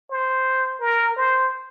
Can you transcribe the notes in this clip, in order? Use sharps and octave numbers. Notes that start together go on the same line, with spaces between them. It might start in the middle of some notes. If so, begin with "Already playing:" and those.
C5
A#4
C5